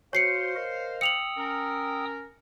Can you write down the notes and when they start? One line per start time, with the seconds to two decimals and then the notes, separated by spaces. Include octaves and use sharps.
0.13 F#4 C5 C#5 F5 C7 C#7
0.56 A#4 D#5
1.01 G5 D#6 E6 C#7 F7 F#7
1.37 C#4 A#4